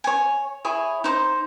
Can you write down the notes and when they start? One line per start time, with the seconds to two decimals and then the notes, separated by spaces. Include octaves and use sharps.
0.04 C#5 G#5
0.65 E4 G#4 C#5
1.04 D#4 C5